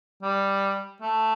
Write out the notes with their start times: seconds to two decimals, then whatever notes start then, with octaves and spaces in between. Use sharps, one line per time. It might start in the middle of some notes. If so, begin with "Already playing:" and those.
0.22 G3
1.02 A3